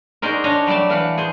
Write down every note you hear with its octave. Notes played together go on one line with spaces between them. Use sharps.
D#4 F#4 G#4 A#4 C5 D5
D4 C#5 D#5 A#5
F#3 G3 A3 D5 A5
E3 F5 F#5
G#4 C5